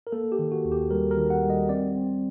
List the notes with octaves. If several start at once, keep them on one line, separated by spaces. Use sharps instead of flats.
A#4
A#3 A4
G4
D#3
F#4
D#2
G4
G3 A#4
A#4
D#3
F#5
G3
D#5
C4 D5
C4